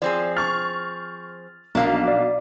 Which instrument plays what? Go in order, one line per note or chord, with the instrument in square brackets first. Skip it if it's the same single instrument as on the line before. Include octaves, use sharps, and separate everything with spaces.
[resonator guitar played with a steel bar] F3 C4 G#4 [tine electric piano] D5
[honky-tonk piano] C#6 F6 [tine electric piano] A6
[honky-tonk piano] B1 F5 [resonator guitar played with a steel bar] F3 A#3 D4
[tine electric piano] D5